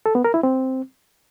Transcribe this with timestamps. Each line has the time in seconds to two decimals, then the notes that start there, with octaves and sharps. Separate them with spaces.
0.06 A4
0.15 B3
0.24 A#4
0.34 E4
0.43 C4